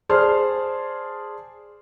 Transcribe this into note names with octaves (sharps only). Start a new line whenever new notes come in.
G#4 C5 D5 A5 C6 F6